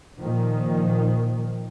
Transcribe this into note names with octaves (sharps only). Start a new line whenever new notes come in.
A#2 D#3 F3